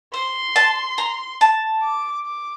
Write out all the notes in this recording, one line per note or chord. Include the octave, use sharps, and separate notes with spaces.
C5 C6
A5
A#5
A5
D6
D6